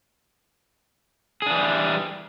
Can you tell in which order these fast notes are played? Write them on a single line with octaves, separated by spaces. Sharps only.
G#4 D4 E3 G3